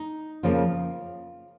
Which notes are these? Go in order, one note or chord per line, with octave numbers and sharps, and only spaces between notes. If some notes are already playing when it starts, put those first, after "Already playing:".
Already playing: D#4
F2 C#3 F3 A#3 F4